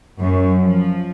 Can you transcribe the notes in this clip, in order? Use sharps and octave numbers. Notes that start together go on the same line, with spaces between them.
F#2
F3